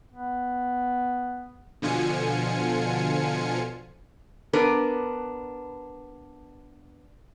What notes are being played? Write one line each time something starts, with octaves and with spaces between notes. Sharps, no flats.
B3
B2 D3 F3 F4 G#5 C#7
B3 D4 A#4 B4